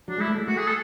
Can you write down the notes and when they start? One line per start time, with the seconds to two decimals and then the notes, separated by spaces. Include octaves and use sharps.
0.08 F#3 D4
0.18 G#3 E4
0.28 A3
0.38 G#3
0.47 A3 F#4
0.57 G#4
0.67 A4